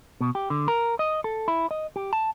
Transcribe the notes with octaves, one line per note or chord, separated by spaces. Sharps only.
B2
G4
D3
A#4
D#5
A4
E4
D#5
G4
A5